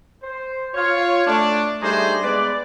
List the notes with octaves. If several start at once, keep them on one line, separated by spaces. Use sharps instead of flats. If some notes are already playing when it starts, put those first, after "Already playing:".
C5
F4 C#5
A3 D4
G3 A3 D4 D#4 G#4 C5
G#3 B3 B4 D5